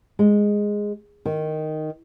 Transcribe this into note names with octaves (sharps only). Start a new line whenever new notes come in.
G#3
D#3